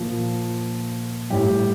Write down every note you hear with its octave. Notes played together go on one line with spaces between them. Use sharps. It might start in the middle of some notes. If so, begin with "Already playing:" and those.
Already playing: A#2 F3
A2 G3 G4